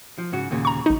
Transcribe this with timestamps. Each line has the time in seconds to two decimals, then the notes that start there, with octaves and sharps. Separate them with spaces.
0.18 F3
0.32 G#2 C#3 F#4
0.51 D#2 A#2 C#3
0.65 A#5 C#6
0.86 A1 D#4